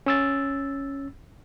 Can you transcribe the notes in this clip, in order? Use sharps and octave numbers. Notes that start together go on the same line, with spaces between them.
C#4 E6 A6